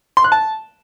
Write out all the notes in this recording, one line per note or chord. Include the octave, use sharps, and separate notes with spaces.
C6
F#6
A5